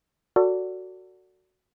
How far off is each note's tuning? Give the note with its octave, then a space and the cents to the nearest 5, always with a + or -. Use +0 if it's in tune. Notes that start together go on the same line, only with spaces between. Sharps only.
F#4 +0 A4 +35 D5 -20